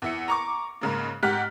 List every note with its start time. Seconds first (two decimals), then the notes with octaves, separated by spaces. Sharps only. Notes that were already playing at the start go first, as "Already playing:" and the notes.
0.02 E2 E4 C#7
0.28 A#5 C#6 D6
0.81 G#2 C#3 A#3
1.23 G#2 G4 F#5 F6 F#6 B6